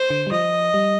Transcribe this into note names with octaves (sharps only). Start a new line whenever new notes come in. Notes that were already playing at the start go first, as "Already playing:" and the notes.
Already playing: C5
D3
G3
F3 D#5
G3